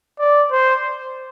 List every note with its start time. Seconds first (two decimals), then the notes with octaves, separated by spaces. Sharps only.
0.19 D5
0.51 C5